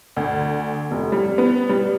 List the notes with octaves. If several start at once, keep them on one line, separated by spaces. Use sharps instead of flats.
D2
F1
G3
B3
G3